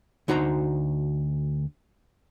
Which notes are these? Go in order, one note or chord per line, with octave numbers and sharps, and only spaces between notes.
D2 D#4 F#4 C5 A#5